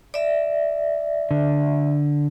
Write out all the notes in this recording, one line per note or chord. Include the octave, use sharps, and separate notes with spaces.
D5 E5
D3